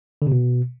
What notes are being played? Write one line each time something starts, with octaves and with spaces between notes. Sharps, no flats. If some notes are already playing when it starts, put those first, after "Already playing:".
D3
C3
B2